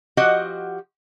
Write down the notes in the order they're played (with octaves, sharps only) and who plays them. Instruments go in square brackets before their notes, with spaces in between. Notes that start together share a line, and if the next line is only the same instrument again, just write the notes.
[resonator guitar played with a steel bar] F3 F#4 G4 D#5 F#5